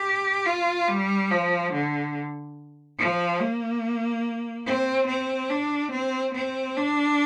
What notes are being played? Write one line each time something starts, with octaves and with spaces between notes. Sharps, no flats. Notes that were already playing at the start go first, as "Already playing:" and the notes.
Already playing: G4
F4
G3
F3
D3
F3
A#3
C4
C4
D4
C4
C4
D4